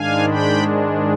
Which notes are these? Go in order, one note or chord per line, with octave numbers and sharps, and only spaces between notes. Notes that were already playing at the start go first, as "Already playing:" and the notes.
Already playing: G#2 D#3 G#3 D4 F5 G#5
G5 B5